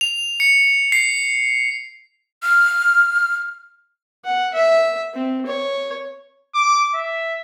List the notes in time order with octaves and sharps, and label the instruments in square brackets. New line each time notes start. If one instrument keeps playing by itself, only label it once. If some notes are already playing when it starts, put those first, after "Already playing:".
[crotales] F7
C#7
C7
[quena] F6
[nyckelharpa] F#5
E5
C4
C#5
[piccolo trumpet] D6
E5